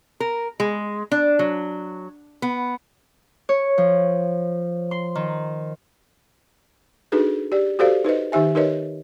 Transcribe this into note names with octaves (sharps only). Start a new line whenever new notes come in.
A#4
G#3
D4
F#3
B3
C#5
F3
C6
D#3
D4 D#4 F#4 G#4 A4 B4
G4 D5
F#4 G4 A4 C5 D5 F5
D#4 B4 C5 D#5
D#3 D#4 G4 E5 G#5
D#4 G4 A#4 B4 C#5 D#5